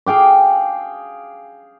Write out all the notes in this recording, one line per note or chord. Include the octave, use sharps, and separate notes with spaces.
G#4 F5 G5 D6